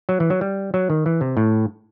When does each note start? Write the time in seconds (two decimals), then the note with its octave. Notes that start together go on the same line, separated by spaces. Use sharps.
0.09 F#3
0.20 E3
0.30 F#3
0.41 G3
0.74 F#3
0.90 D#3
1.06 E3
1.21 C3
1.37 A2